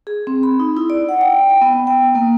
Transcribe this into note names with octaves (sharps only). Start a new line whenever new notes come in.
G#4
C4
B5
D#4
E4
D5
F#5
G5
G5
B3
G5
A#3